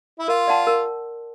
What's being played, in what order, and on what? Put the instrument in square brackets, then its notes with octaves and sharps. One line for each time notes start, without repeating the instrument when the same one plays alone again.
[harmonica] E4
[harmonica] F4 [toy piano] A#4
[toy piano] D5 F#5 A5 C6
A#4